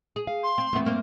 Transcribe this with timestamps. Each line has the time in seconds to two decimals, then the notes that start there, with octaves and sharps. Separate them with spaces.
0.16 G#4
0.27 F5
0.43 C6
0.58 C4
0.73 E2 A3 B3 C4
0.85 G2 A#3 C5